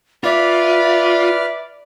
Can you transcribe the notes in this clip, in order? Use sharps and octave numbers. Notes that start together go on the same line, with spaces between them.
F4 B4 D5 E5 F6